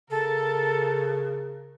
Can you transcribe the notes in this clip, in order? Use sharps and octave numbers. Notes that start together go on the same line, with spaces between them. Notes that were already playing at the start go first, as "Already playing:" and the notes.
C#3 A4 A#4